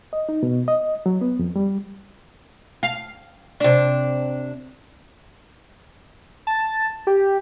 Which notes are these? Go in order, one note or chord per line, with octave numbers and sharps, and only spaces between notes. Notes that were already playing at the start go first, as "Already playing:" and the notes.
D#5
D#4
B2
D#5
F#3
B3
F2
G3
F5
C3 D4
A5
G4